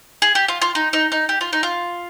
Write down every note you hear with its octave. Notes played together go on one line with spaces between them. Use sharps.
G#4
G4
F4
F4
D#4
D#4
D#4
G4
F4
D#4
F4